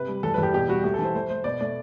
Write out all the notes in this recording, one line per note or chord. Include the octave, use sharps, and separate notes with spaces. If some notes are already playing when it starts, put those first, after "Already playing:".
Already playing: C3 B4
G3
E2 A4
B4
E2
G4
B2 G4
G3 F#4
A3 G4
A4
E3
C5
A3 C5
A3 C5
B2 D5
A3 D5